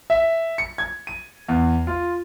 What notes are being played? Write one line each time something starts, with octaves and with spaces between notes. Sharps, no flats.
E5
C#7
G#6
D#7
E2
F4